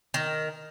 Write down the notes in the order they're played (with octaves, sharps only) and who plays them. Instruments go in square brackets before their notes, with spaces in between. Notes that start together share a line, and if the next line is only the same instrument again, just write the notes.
[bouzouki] D#3